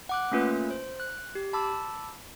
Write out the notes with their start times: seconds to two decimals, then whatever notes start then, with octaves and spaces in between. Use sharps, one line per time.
0.09 F#5 D6 F#6
0.32 A3 A#3 C#4 F4 B4
0.70 C5
1.00 F#6
1.35 G4
1.53 A5 B5 D6 E6